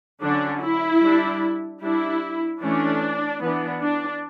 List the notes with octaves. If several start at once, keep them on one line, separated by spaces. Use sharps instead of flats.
D3 F#3 C#4 D4
E4
G3 D4
G3 D4 E4
E3 A3 C#4 D4
E3 B3 D4
D4